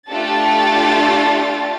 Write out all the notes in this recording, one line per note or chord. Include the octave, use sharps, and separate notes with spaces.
A3 D4 F4 G4 A4 A6